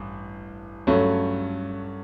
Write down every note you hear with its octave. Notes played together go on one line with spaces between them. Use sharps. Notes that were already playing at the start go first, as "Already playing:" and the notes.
Already playing: A1 G2
G2 F#3 A3 C#4